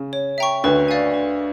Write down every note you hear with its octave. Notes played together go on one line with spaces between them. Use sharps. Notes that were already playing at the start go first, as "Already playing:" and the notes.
Already playing: C#3
C#5
E5 G5 A#5 C#6
D2 D3 B4
D5 F5 G#5
B4